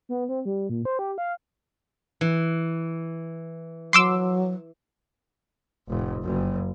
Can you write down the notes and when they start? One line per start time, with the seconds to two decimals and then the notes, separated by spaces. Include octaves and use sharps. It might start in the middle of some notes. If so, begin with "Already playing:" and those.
0.09 B3
0.29 C4
0.45 G3
0.70 A#2
0.85 C5
0.99 G4
1.18 F5
2.21 E3
3.93 F#3 C6 D6 E6
5.89 F1 A2
6.22 F#1 F#2